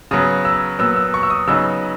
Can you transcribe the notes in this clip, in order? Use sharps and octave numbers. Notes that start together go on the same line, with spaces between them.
C#3 F#3 B3 D#6
E6
A#2 F#3 B3 E6
E6
C#6
E6
D#6
C#3 F#3 B3 D#4 E6